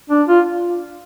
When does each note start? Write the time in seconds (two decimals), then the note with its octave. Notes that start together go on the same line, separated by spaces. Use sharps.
0.10 D4
0.28 F4